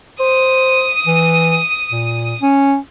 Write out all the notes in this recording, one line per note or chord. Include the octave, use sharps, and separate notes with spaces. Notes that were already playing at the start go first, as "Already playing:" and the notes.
C5 D#6
E3
A#2
C#4